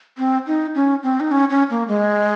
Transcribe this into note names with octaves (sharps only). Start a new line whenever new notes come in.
C4
D#4
C#4
C4
D#4
C#4
C#4
A#3
G#3